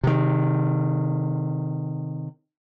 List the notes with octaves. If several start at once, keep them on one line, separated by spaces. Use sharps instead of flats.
C3 D#3